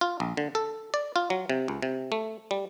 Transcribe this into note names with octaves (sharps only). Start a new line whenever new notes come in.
F4
A#1
D3
A4
D5
F4
F#3
C3
C#2
C3
A3
G3